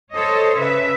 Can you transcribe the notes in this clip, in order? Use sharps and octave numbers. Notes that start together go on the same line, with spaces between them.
A4 C5 C#5 D#5
C#3 B4 E5